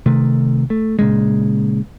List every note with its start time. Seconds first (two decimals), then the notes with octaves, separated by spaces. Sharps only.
0.06 C3 D#3 A3
0.70 A3
0.99 A#2 C#3 G#3